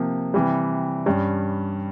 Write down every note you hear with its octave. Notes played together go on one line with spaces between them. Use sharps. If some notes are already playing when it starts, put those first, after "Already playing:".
Already playing: C3 F3 A#3
C3 E3 G3
G2 G3 C#4